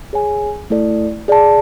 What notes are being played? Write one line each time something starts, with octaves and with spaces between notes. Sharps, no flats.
G#4 C#5 G#5
A3 E4 A4 D5
G#4 D5 A5